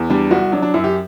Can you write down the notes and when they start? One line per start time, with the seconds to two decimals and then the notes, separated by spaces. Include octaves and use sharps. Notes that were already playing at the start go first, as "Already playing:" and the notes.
Already playing: E2
0.10 G3 D4
0.31 C2 F#4
0.52 F#3 D4
0.62 D4
0.74 F#2 E4
0.84 G4